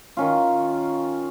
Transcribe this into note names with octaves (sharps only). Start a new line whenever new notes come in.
D#3 C#4 F4